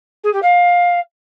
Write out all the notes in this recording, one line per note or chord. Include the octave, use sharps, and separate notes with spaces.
G#4
G4
F5